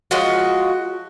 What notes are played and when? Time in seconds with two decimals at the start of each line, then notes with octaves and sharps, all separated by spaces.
0.11 F3 G#3 F#4